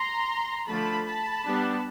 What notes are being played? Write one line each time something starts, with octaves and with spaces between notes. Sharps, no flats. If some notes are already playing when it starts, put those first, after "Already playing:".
Already playing: A#5 C6
D3 F3 A3 A5 B5
A5 B5
G3 B3 D4